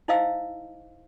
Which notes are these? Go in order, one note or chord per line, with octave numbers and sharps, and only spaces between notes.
D#4 E4 C5 D#5 F5 E6